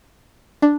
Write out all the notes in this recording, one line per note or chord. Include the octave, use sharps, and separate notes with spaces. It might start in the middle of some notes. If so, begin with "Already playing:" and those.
D4